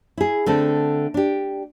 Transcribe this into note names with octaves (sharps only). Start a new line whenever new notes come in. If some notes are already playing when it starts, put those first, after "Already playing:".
E4 G#4
D3 A3 C4 A4
D4 G4